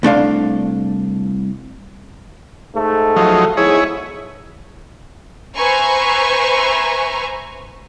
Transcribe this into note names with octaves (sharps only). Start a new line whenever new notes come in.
C2 A3 D4 F5
G#2 A3
F3 F#3 D#4
E2 G#2 E4 G#4 C#5
B4 C5 E5 G#5 A#5 C#6